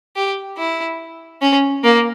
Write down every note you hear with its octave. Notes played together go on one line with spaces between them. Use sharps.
G4
E4
C#4
A#3